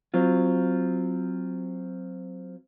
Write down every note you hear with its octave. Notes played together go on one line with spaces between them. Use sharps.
F#3 C4 F4